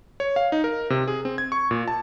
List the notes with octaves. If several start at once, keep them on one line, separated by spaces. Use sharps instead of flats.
C#5
F5
D#4
A#4
C3
G#4
C4
G#6
C#6
A#2
A5